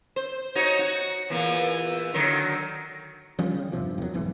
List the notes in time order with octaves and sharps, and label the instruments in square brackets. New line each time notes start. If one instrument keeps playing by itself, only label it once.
[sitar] C5
D#4 F#4 C#5
F#4
E2 A#2 E3
D3 D#3 F#3
[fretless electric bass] D#3 F3 G3 C#4
C#3
E2 G2 C3 F3
E2 D#3 F#3
D#1 B1 G#2 E3